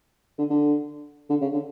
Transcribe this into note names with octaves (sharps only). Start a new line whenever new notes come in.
D3
D3
D3
C#3
D3